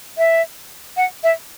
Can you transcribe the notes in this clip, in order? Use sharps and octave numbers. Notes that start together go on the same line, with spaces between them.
E5
F#5
E5